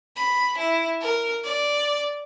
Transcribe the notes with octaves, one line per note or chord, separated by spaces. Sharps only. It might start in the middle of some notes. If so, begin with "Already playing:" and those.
B5
E4
A#4
D5